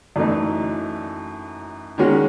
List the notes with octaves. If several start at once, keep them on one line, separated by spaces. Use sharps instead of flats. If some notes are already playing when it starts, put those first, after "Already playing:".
F#2 E3 A3 D#4
D#3 G#3 C#4 F#4